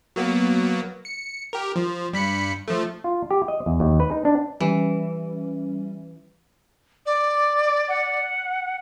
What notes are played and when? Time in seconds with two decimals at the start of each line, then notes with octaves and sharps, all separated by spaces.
0.16 F#3 A#3 B3
1.05 C#7
1.53 G4 A#4
1.76 F3
2.13 G2 B5 C#7
2.68 F3 A3
3.04 F4
3.31 G4
3.48 D#5
3.66 E2
3.80 D#2
4.00 B4
4.11 D#4
4.25 D4
4.60 E3 G3 C#4
7.06 D5
7.88 F#5